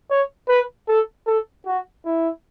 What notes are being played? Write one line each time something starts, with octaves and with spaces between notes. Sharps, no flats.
C#5
B4
A4
A4
F#4
E4